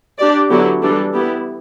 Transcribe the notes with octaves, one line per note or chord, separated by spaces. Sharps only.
D4 G4 D5
D3 F#3 B3 E4 G4
E3 G3 D4 A4
B3 E4 G4